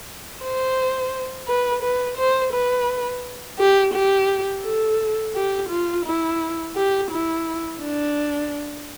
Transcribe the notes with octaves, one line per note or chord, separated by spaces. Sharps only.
C5
B4
B4
C5
B4
G4
G4
A4
G4
F4
E4
G4
E4
D4